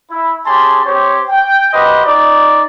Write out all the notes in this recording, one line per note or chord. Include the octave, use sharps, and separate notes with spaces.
E4
C#4 G4 G#4 G#5 A5 C6
C4 G4 C5 C#5
G5
F#4 G4 B4 C5 D#5
D#4 D5